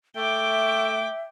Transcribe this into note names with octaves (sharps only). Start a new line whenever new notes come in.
A3 E5 G5 D6